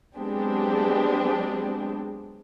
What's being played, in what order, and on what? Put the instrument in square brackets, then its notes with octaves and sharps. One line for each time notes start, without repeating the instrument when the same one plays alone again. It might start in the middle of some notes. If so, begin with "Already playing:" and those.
[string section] F#3 G#3 B3 C4 D4 G4